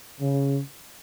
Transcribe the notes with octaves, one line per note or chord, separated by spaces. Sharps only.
C#3